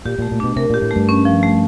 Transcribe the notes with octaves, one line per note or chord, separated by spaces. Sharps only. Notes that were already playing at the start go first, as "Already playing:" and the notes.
A#2 G4
A#2 A3
A#2
B2 D4
C3 A#4
A#2 G4
A2
A3
G2
C#4
F3
A3